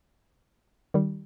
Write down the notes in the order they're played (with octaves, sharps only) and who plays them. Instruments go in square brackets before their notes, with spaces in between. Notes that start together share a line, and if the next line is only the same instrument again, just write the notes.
[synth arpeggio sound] D#3 G3